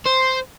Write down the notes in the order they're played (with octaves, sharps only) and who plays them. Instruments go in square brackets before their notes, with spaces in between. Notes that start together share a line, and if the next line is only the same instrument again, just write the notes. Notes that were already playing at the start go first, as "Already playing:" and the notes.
[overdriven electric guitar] C5